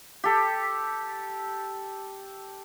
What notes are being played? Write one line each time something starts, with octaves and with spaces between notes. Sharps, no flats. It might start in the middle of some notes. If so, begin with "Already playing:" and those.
G4 A4